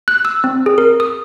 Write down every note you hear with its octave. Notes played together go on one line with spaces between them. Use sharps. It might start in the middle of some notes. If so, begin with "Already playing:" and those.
F#6
E6
C4
G#4
A#4
D#6